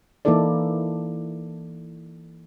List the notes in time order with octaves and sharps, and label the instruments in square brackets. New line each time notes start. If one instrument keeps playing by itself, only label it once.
[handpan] E3 A#3 D#4 E4 A4 D5